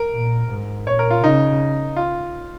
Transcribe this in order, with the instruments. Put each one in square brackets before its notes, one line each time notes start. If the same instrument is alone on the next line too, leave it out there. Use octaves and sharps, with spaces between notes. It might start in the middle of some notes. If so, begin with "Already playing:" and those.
Already playing: [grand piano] A#4
[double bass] A#2
G#2
[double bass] A#2 [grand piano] C#5
[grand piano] A#4
F4
[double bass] C#3 [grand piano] D#4
[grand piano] F4